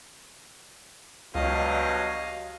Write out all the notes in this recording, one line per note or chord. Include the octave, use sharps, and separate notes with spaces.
C#2 G2 B2 F#3 D#5 F5